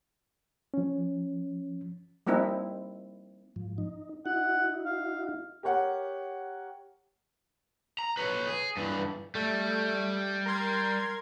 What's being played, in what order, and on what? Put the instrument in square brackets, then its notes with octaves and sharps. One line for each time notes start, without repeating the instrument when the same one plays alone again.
[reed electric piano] F3 C#4
[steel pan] G3 A#3 C4 D#4 E4
[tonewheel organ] G#2 F3
D#4
[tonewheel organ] D#4 E4 F#4 [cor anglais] F#5
[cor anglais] F5
[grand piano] G4 A#4 C#5 F#5
[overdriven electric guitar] A#5
B4 C#5
G#4
G2 E3
[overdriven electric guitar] G3 [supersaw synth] A3
[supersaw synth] A#4 C6 G#6